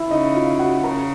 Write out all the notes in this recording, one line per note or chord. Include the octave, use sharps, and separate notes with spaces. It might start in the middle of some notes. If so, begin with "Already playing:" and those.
Already playing: E4 E5
C#3 D#4 D#5
F4 F5
F#4 F#5
C#3 A#4 A#5